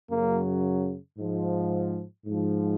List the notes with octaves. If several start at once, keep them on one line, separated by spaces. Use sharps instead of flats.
F#2 C#3 F#3 A#3
G#2 F3
G#2 F3